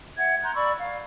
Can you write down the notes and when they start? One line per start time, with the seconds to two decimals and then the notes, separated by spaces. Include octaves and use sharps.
0.18 E5 F#5 G#6
0.43 A#5 C6 F#6 G6
0.55 D5 B5 C#6 E6
0.78 F5